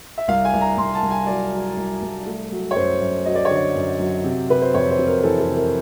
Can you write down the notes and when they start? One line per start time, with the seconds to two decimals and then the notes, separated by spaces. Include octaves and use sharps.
0.18 E5
0.28 C2 F5
0.45 G#5
0.54 C2
0.61 A#5
0.77 C2 C6
0.95 A5
1.03 C2
1.11 G#5
1.27 F#3 D5
1.52 F#3
1.77 C2
2.02 C2
2.26 A3
2.51 F#3
2.71 C#5
2.76 F#2 C5
3.01 F#2
3.26 F#3 D#5
3.35 D5
3.45 C#5
3.50 D3
3.55 D5
3.75 F#2
3.99 F#3
4.24 C3
4.50 C3 B4
4.62 C5
4.74 F2 C#5
4.91 C5
4.98 C3
5.07 A#4
5.23 E3 A4
5.40 A4
5.49 C3
5.57 A#4